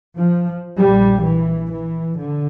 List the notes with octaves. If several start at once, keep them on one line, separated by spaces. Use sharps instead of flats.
F3
A#1 A#2 G3
E3
E3
D3